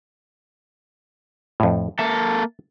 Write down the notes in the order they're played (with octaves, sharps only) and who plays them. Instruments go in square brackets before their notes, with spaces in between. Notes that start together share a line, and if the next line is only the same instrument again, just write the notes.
[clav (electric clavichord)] F2 A2
[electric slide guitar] A#3 A4 [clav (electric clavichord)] E5